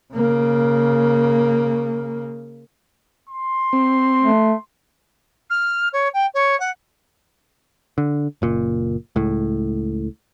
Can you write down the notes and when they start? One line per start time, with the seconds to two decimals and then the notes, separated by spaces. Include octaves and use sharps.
0.13 C#3 A#3
3.29 C6
3.73 C4
4.21 A3
5.50 F6
5.93 C#5
6.14 G5
6.34 C#5
6.60 F#5
7.98 D3
8.42 F#1 A#2
9.16 C#2 A2